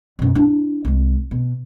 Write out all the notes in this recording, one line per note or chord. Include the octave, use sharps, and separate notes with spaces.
F#2 B2
D4 E4
C2 G#3
B2